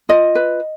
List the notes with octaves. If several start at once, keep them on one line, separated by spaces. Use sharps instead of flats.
F4 D#5
B4